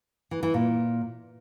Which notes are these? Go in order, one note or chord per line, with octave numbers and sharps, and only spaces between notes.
E3
E3
A#2